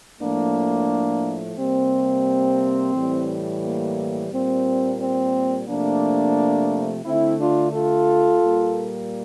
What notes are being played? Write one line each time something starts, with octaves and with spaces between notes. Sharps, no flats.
A2 F3 A3 A#3 D4
C3 G3 A#3 C4
A2 E3 G3
A#3
A#2 G3 A#3 C4
C4
C3 F3 A3 A#3 D4
D3 A3 C4 E4
D4 F4
F4 A4
A#2 G3 A#3